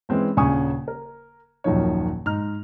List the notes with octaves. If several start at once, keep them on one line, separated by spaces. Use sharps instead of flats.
E3 G#3 C4 C#4
D#1 C#3 D4 G#5 C#6 D#6
A#4
D#1 F#2 D#3 F3 D#4 C#5
G#2 D#4 A#5 F6